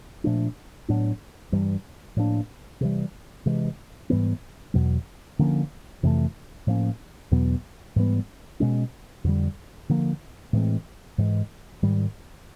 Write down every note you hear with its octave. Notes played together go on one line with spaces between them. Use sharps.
A#2 F3 A3 D4
A2 F#3 B3 D4
G2 E3 G3
A2 F3 A#3 D4
C3 E3 G3
C3 E3 G#3
G#2 E3 G3 B3
E2 B2 F#3
D3 F3 A#3 C#4
F2 C3 E3 A3
A2 F3 A#3 C#4
E2 B2 F#3 B3
G#2 E3 G3 B3
B2 G#3 C#4
F2 D3 G3
D3 F3 A#3
A2 E3 G#3 C4
G#2 E3 G#3
G#2 D#3 G3